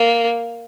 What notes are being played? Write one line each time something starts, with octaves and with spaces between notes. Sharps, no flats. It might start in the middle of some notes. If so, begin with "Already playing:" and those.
Already playing: A#3